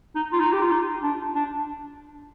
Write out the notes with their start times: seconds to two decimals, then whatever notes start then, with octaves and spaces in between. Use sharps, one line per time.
0.15 D#4
0.33 F4
0.40 D#4
0.52 G4
0.61 F4
0.71 D#4
1.03 D4
1.34 D4